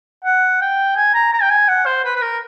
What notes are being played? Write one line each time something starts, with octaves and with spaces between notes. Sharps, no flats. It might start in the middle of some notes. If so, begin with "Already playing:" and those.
F#5
G5
G#5
A#5
A#5
G5
G#5
F#5
C5
B4
B4
A#4